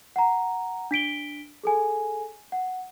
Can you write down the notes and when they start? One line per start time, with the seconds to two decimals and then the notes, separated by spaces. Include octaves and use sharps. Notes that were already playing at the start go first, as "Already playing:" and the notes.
0.16 F#5 A#5
0.91 D4 B6 D7 G7
1.63 G#4 A4 G#5
2.52 F#5